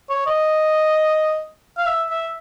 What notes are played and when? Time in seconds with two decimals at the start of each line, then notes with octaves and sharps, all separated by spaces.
0.09 C#5
0.27 D#5
1.77 F5
1.86 E5
2.10 E5